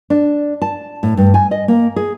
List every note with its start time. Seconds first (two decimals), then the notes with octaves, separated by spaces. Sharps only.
0.10 D4
0.62 A5
1.03 A2
1.17 G2
1.34 G#5
1.51 D#5
1.68 A#3
1.96 G#4